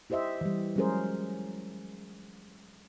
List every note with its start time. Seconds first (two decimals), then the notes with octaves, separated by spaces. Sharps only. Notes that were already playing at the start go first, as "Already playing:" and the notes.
0.10 E4 G4 C5 D#5 E5
0.41 E3 G3
0.76 F#3 G#3 C#4 G#4 A#4 C5